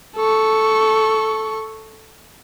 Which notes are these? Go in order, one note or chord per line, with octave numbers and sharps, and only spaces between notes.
A4 C#6